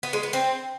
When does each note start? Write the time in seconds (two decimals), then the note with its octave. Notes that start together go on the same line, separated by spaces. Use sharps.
0.03 B3
0.13 G#3
0.23 B3
0.33 C4